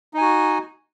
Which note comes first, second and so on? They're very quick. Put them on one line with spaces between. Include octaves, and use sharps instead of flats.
D#4 G#5 F#4